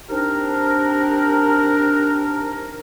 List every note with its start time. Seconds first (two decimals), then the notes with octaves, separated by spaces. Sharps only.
0.09 C3 C4 D4 D#4 A#4